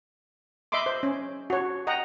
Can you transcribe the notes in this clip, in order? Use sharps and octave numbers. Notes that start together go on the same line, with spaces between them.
D#5 E5 B5 C6 D6
C5
C#4
F#4 C#5
D#5 F#5 G5 A#5